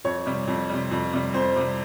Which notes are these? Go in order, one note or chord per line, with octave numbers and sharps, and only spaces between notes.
F2 C#5
C3 G3
F2
C3 G3
F2
C3 G3
F2 C5
C3 G3